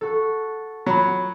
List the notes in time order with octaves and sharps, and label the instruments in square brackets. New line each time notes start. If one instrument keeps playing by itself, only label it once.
[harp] F#4 A4
[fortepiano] F#3 [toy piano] F4 B5